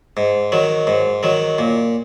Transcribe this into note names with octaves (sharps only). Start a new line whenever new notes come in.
G#2
D#3 F#3
G#2
D#3 F#3
A#2